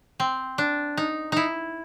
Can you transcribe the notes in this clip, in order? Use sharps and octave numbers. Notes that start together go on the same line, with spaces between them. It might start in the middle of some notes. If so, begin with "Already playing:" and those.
C4
D4
D#4
D#4 E4